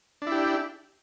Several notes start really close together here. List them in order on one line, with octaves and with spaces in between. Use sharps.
D4 E4 G4